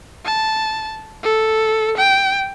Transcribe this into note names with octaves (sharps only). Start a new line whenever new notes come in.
A5
A4
G5